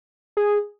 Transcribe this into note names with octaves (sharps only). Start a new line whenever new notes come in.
G#4